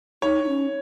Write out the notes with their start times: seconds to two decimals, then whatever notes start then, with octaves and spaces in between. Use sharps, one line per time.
0.22 D#4 C#5
0.44 D#4
0.48 C#4